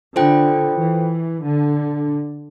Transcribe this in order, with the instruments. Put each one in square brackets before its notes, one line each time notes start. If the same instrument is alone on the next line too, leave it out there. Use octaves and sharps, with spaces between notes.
[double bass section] D3 [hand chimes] F4 A4 C5 G5
[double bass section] E3
D3